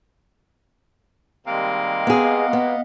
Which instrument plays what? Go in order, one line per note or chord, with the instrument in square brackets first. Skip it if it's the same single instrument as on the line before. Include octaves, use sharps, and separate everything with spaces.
[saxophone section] C3 G#3 A#3 [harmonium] D#3 G3
[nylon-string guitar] B3 G#4
[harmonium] D#5 F5 F#5
[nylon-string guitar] B3